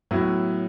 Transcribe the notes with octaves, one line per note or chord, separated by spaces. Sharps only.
A2 F#3 B3 E4